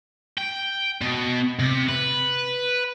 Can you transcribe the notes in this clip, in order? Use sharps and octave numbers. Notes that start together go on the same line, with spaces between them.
G5
B2
C3
B4